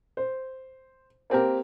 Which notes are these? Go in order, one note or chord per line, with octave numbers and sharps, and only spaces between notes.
C5
A#3 C4 G4 A#4